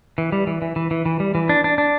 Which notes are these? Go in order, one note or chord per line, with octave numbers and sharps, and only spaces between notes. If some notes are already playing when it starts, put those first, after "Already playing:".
E3
G3
E3
E3
E3
E3
E3
G3
E3
D4
D4
D4